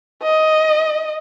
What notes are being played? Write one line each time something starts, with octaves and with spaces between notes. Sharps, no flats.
D#5